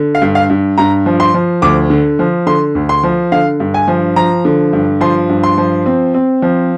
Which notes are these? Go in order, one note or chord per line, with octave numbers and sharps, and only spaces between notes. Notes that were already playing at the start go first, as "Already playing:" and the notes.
Already playing: D3
F5
G2
F5
G2
G2 A#5
F3
C6
F3
D2 D6
D3
F3
D3 C6
D2
C6
F3
D3 F5
G2
G#5
F3
F3 A#5
D3
G2
F3 C6
G2
C6
F3
C4
C4
F3